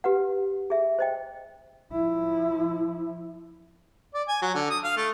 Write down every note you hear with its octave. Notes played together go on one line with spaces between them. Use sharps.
G4 B4 F#5
G#4 E5
C5 D#5 G5
F3 E4
D5
G#5
F#3
D3
D#6
F5
A3